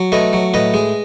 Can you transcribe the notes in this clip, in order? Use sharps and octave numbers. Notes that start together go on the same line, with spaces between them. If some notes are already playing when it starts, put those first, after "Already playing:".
Already playing: F#3
A3 B4 D#5
F#3
A2 B4 D#5
G#3